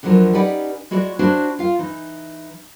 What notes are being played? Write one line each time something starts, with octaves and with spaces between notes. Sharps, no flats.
E2 D3 F3 F#3 A#4
C#4 D#4 G4 B4 D5 F#5
G#3 E4 F#4 C#5 D5
D4 E4 F#4 C5 C#5
F4 F5
E3 D#4